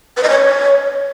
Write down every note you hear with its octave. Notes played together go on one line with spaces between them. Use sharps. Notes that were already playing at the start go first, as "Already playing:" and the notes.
B4
D#5
C#5